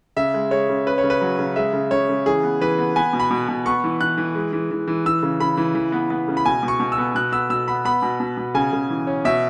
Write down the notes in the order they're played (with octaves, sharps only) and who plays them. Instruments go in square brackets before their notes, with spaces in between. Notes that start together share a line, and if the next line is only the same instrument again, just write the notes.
[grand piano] C#3 E5
G#3
G#3 C#5
C#3
C#4 B4
C#5
C#3
B4
F#3
C#3
G#3 E5
C#3
C#3 C#5
C#3
E3 G#4
B3
E3 B4
B3
B3 G#5
B2
B5
B2
B2
B3 C#6
E3
E3 F#6
E3
G#3
E3
E3
E3
E3 E6
C#3
C#3 B5
E3
E3
B3
B3
C#3
B5
B2 G#5
B2
C#6
B2
E6
B3
B2 F#6
B3 E6
B2 E6
B3 B5
B3 B5
B2
B2
B2
C#3 G#5
C#3
E3
C#4
B2 E5